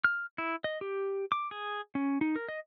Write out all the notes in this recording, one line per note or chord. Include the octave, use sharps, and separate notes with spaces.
F6
E4
D#5
G4
D6
G#4
C#4
D#4
A#4
D#5